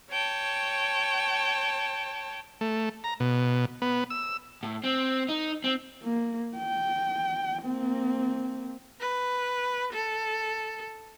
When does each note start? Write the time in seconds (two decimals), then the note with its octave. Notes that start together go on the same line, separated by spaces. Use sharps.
0.10 C#5 G5 A5
2.61 A3
3.04 A#5
3.20 B2
3.82 B3
4.10 E6
4.63 A2
4.84 C4
5.29 D#4
5.64 C4
6.03 A#3
6.56 G5
7.63 A#3 C4
9.00 B4
9.93 A4